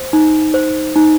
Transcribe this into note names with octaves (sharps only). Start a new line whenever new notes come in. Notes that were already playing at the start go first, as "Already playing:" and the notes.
Already playing: C5
D#4
C5
D#4